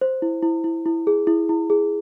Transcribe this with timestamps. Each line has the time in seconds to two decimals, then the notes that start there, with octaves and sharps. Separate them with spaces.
0.01 C5
0.22 E4
0.43 E4
0.64 E4
0.86 E4
1.07 G#4
1.27 E4
1.49 E4
1.70 G#4